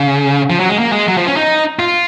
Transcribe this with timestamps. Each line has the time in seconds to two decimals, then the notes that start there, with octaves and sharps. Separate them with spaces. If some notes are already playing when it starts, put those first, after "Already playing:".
Already playing: C#3
0.50 F3
0.60 F#3
0.69 G#3
0.79 A#3
0.92 G#3
1.08 F#3
1.17 F3
1.27 C#4
1.37 D#4
1.79 F4